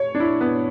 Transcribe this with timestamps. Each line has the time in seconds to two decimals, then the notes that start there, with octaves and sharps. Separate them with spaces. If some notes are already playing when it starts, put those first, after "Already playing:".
Already playing: C#5
0.15 D4
0.20 E4
0.41 B3